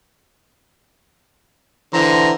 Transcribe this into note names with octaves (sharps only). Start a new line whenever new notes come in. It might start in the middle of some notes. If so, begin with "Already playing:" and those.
D3 E3 C5 A#5